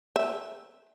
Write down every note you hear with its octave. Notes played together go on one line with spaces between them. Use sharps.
E5